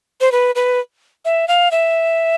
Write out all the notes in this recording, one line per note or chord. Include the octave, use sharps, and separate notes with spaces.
C5
B4
B4
E5
F5
E5